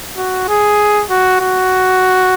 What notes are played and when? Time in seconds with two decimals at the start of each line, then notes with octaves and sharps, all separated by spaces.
0.17 F#4
0.48 G#4
1.10 F#4
1.41 F#4